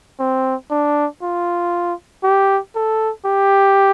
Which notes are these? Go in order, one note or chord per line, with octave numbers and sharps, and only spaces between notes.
C4
D4
F4
G4
A4
G4